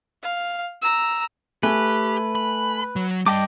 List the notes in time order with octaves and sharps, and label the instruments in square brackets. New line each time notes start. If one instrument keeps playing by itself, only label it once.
[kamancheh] F5
A#5 E6
[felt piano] A3 G#5 [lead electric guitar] G4 [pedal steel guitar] B4
[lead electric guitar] B5
F#3
[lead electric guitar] G2 G3 [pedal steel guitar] D#5 G5 D6 [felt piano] A5